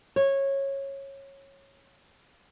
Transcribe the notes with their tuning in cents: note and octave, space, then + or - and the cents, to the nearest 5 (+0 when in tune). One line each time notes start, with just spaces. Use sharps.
C#5 -15